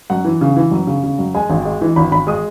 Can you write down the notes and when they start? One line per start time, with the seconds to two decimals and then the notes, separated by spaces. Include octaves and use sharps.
0.10 F#2 F#5
0.25 E3
0.41 C#3
0.56 E3
0.71 F#2
0.87 C#3
1.03 C#3
1.19 F#2
1.34 G#3 G#5
1.50 G#1
1.65 G#3
1.81 E3
1.96 G#1 B5
2.11 G#1 B5
2.27 G#3 D#6